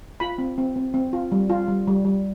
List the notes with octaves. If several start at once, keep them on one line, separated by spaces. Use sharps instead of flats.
F4 B5
C4
C4
C4
C4
F4
G3
F4
G3
G3
G3